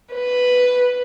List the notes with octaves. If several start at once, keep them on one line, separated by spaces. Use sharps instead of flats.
B4